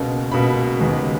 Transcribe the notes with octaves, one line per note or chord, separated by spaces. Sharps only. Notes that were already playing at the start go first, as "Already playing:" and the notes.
Already playing: C#2 B2 A#3
C#2 B2 A#3 B5
D#2 C#3 G#3 B3